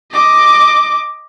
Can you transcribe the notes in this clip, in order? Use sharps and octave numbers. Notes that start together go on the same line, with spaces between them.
D#5 D6